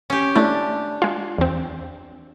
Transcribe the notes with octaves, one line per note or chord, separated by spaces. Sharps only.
C#4 G4
A3 D4 E4
G#3 F4
E2 C4